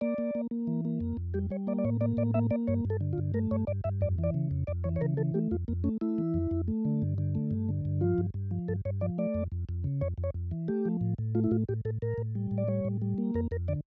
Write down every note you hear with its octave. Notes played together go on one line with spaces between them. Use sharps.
A#3 D5
A#3
A#3
A#3
E3
A#3
F2
F2
G3 G4
G3 C#5
A#3 D5
D5
A2 C#5
A#3 D5
A2 D5
A#3 E5
A#3 D5
G2 C#5
G2
A4
D3
F4
G2
A3 A#4
G2 C#5
G2 D5
G2 E5
F2 D5
E3
D5
C#3
F2
F2 D5
E3 C#5
C#5
C#3 A#4
E3 A4
A3 G4
F2 F4
F2 A#3
A3 C#4
A3 E4
E3
F2
F2
A3
D3
G2
D3
A3
G2
D3
G2
F3 F4
G2
G2
F3
G2 A4
G2 C#5
F3 D5
A3 D5
F2
F2
F2
C#3
F2 C#5
F2
C#5
F2
E3
A3 G4
F3
A2
A2
A3 F4
E4
A2 F4
A2 G4
A2 A4
A2 A#4
A2
G3
A2
D5
G3 C#5
A2
G3
A#3
F2 A#4
F2 A#4
D3 D5